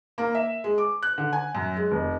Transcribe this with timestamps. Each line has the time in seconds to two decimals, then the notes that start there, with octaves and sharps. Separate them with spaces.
0.18 A#3
0.35 E5
0.64 G#3
0.78 D6
1.03 F#6
1.18 D3
1.33 G#5
1.55 F#2
1.77 G#3
1.91 F1